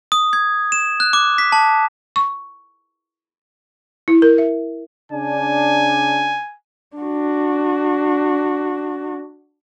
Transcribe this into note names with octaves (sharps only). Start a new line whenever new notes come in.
D#6
G#6
E7
F#6
D6
B6
A5
C#6
E4
A#4
E5
C#3 D4 G#5
D4 F#4